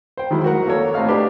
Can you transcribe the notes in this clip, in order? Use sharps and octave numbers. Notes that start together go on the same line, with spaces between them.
C5 G5
D#3 F#3 G#3 E4
F#4 A#4 F#5
A#3 A4 C#5
A2 C4 D#5 F5 F6
D4 G4 B4 C5 F5 A5